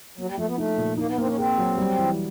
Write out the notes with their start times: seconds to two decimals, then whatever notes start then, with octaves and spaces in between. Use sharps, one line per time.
0.18 F#3 A#3
0.27 G3
0.37 F3 A3
0.47 B3
0.57 A3 D#4
0.77 A#2
0.97 A#3 D#4
1.08 B3
1.18 A#3 C4
1.24 D4
1.27 C#4
1.37 C4 G#4
1.58 F#3
1.78 G3
1.99 E3